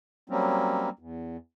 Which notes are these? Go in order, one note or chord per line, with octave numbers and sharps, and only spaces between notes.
F#3 G3 A#3 C4 C#4
E2